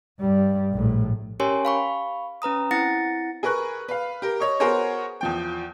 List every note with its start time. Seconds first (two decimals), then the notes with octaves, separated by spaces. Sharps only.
0.20 G2 G3
0.72 A#1 A2
1.40 C#4 G4 A#4 C#5 G#5 C6
1.65 F5 B5 C#6
2.42 C#4 B4 A#5 D#6
2.71 C4 E4 F#5 A6 A#6 C#7
3.43 G#4 A#4 B4 C#6 F#6
3.89 B4 F5
4.22 G4 A#4
4.40 C#5 D#5 C#6
4.60 B3 F#4 G#4 A#4 C5 C#5
5.21 E2 F3 G5